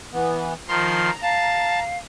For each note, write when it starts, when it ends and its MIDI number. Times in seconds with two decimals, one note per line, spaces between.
0.13 0.54 52
0.13 0.54 59
0.68 1.11 51
0.68 1.11 53
0.68 1.85 82
0.68 1.11 84
1.22 1.98 77
1.22 1.79 81